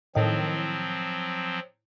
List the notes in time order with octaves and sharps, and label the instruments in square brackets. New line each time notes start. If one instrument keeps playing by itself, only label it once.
[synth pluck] A2 D#3 [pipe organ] F3 F#3 C4